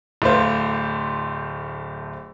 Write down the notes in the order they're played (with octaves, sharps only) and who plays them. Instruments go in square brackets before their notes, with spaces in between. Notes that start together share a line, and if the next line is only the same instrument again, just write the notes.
[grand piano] D1 A3 F4 C5